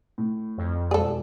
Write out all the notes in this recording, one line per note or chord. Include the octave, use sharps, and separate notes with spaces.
A2
F2
E1 G#4 A4 D5